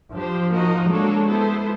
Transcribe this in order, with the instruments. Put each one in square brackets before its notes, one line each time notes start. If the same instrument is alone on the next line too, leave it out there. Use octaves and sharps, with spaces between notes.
[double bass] F3 [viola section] D4 G4 C5
[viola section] A#3 D#4 F#4 A#4 D#5
[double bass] G#3 [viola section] A#3 D4 F#4 A4 C#5
[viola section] B3 E4 A4 C5